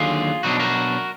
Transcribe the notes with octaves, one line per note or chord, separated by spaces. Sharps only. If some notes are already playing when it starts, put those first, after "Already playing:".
Already playing: D#2 D3 F#3 F4 G#4
B2 F#3 D4 D#4 F#4
F#4 A#4